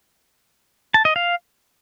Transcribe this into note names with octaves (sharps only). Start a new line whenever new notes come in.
A5
D#5
F5